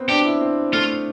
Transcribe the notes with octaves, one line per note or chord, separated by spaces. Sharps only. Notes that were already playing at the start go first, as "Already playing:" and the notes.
Already playing: B3 C4
D4 G4
E4
C4
A3 F4